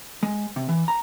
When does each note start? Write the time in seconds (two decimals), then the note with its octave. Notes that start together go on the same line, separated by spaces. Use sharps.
0.23 G#3
0.56 C3
0.69 E3
0.88 A#5